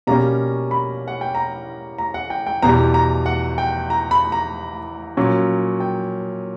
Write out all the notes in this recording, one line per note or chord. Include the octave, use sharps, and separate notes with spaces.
B2 G3 A#3 C#4 A#5
B5
F#5
G5
A#5
A#5
F#5
G5
G5
E2 B2 G3 A#5
A#5
F#5
G5
A#5
B5
A#5
A#2 F#3 C#4
G5